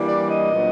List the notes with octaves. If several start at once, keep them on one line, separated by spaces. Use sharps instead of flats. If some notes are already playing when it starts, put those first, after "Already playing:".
Already playing: E3 G3 A#3 D4
D5
D#5
A#2 F#3 B3 D4